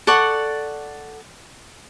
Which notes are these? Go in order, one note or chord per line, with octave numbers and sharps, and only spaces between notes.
A4 D5 F#5 C#6